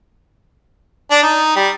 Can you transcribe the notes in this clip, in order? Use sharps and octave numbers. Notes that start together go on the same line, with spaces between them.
D4
D#4
G3